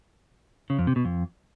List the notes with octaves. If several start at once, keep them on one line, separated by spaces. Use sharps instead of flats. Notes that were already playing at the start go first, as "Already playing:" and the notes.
C#3
F2
C3
B2
F2